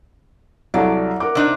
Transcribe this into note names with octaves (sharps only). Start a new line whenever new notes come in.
C2 F#3 A4 D5
A#4 F#5 D6
C3 D4 D#4